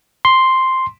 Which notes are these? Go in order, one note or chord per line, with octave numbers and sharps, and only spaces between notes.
C6